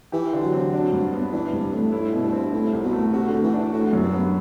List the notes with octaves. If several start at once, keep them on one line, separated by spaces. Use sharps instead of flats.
E3 G4
D3
F#3
C4
D4
G2
B3
E3 D4
G2 C3
A2 A3
A2 E4
B2
G2
C4
A2 E4
C2
B2
A3
C3 F#4
D3
A2
E3
D4
A2 F#4
F#2
G2
B3